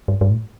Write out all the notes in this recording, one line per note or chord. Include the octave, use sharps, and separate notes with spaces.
G2
G2
A2